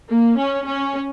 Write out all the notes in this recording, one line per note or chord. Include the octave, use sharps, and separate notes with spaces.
A#3
C#4
C#4